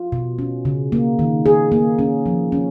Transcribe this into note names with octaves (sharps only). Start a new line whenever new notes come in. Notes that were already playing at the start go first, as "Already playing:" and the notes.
Already playing: F4
B2
C#4
C#3
A#3
D#3
G#4
A#3
C#4
F3
C#4